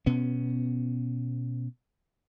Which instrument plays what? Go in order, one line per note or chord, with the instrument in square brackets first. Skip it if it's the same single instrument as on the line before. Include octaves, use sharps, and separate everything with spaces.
[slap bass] B2 B3 C#4